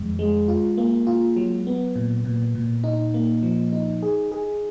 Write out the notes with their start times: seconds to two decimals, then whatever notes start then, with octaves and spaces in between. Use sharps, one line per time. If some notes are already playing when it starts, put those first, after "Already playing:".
Already playing: F2 D#3 G#3
0.19 G#3
0.48 F4
0.78 A#3
1.07 F4
1.36 F#3
1.67 B3
1.96 A#2
2.25 A#2
2.55 A#2
2.84 D#4
3.14 A#3
3.43 F3
3.72 D#4
4.03 G#4
4.32 G#4